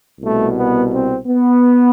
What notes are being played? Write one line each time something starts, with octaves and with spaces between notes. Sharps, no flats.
C2 B2 A3
B3
C4
B3